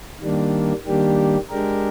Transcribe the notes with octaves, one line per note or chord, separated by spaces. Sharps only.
D#3 G3 A#3 D4
D#3 G3 A#3 D4 G4
G#3 D4 G4 A#4